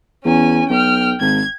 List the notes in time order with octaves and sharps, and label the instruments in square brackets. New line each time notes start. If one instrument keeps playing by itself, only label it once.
[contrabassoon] E2 [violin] C#4 G#5
[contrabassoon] B1 [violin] G5 F6
[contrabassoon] G#1 [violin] G#6